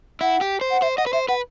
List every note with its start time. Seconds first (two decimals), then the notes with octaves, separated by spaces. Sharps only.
0.21 E4 F#5
0.41 G4
0.61 C5
0.71 F#5
0.82 C5 E5
0.97 D#5 F#5
1.06 B4
1.13 C5 E5
1.28 B4 F#5